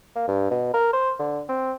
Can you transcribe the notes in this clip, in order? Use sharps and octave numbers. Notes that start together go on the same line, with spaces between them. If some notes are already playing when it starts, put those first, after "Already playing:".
A#3
G2
B2
A#4
C5
D3
C4